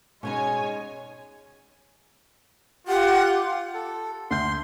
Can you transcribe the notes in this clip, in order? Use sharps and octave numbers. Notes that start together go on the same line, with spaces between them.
B2 G#3 B3 C#4 D#4 C#5 G#5
F4 G4 F#5
A4
D2 C6 G6